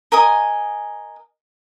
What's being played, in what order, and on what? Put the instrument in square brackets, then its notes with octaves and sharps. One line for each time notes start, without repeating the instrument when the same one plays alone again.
[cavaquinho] A#4 D#5 G#5 D#6